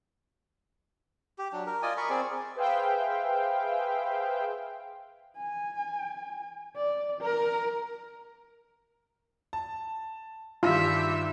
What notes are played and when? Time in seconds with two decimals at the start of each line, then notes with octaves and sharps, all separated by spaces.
1.38 G4
1.53 F#3 D4
1.66 A#4
1.82 F4 D5 D#5 G#5
1.97 A#4 B5 C#6
2.10 C4 G#4 D5
2.55 G#4 B4 C5 E5 F5 G5
5.37 G#5
6.76 D5
7.21 A#4
9.53 A5
10.63 G2 D#3 F4 G4 E5